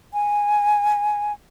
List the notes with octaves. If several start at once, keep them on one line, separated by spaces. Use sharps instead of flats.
G#5